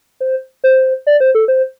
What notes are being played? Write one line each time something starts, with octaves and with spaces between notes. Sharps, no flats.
C5
C5
D5
C5
A4
C5